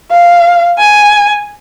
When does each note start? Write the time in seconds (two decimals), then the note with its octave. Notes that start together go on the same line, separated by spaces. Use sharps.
0.11 F5
0.78 G#5